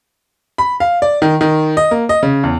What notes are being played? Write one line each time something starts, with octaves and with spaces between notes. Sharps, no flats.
B5
F5
D5
D#3
D#3
D#5
A#3
D#5
C#3
E2